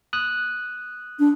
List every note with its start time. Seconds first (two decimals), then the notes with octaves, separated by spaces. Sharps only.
0.13 D#6 F#6
1.19 D4